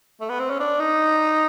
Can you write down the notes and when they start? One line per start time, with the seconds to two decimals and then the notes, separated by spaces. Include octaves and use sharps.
0.21 A3
0.29 B3
0.39 C4
0.50 C#4
0.60 D4
0.80 D#4